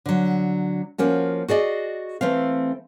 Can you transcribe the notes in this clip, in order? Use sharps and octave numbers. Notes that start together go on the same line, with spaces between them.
D3 F#3
F3 A#3 C#4 F#4
F#4 G#4 D5 D#5
E3 A3 C4 F5